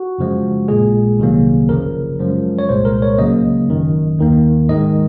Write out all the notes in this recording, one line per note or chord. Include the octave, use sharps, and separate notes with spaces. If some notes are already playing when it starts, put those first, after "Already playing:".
Already playing: F#4
F#2 C#3 F3 G#3
A#1 A#2 G#3 G#4
C2 C3 D#3 F#3 A#3
G#1 F#2 C#3 F3 A#4
F#2 F3 G#3
C#5
C2 A#2 G#3 C5
A#4
C#5
C#2 C#3 F#3 A#3 D#5
G#1 F#2 D#3
D#2 D#3 A#3
G#2 D#3 G#3 D#5